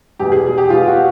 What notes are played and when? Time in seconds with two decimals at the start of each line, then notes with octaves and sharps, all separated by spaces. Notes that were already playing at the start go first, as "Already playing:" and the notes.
0.19 E2 B2 G4
0.32 G#4
0.58 G4
0.70 E2 B2 F4
0.88 F#4